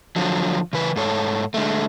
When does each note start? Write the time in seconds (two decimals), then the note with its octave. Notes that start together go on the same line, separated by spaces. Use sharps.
0.16 D3 F3 F#3
0.73 C#3 E3 B4
0.96 G#2 A4 C#5
1.54 D3 G#3 A3